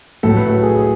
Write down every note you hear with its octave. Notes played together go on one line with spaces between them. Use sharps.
A2 F#3 A3 A4
B4
A4
G#4
G#4